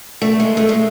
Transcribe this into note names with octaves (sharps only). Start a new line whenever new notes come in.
A3
G#3
A3
G#3